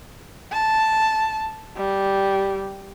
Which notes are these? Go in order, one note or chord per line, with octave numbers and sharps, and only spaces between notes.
A5
G3